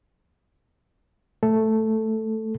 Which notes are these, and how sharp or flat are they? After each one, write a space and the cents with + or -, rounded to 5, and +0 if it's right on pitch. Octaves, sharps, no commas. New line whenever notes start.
A3 +0 A4 +0